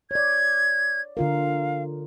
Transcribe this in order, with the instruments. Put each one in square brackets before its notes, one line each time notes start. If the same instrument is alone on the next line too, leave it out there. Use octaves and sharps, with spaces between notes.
[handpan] C#5 D5 [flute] G#6
[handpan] D3 F4 A#4 [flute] F5